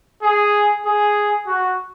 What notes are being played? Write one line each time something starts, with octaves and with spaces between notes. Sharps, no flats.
G#4
G#4
F#4